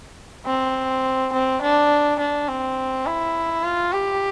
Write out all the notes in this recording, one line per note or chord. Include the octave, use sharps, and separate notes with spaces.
C4
C4
D4
D4
C4
E4
F4
G4